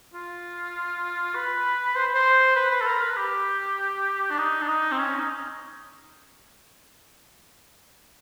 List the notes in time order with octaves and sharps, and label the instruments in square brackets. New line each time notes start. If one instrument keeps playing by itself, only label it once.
[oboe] F4
B4
C5
C5
B4
B4
A4
A#4
B4
G4
D4
D#4
D4
D#4
C4
C#4
D#4